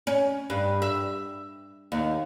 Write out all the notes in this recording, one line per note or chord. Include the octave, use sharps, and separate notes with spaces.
C#4
G2
E5
D#2